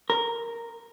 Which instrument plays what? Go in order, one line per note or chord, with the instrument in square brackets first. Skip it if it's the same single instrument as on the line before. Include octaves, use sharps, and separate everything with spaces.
[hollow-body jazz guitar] A#4